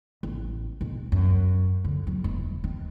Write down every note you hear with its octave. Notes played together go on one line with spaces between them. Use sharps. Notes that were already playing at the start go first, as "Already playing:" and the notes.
A1
B1
F#2
D3
F#3
E1
D#3